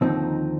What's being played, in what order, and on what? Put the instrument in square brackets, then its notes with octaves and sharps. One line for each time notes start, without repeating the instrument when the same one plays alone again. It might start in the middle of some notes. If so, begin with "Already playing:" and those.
[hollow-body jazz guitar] D#2 D3 F3 C4 D#4